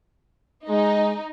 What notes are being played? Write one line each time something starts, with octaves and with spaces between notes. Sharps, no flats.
G#3 D#4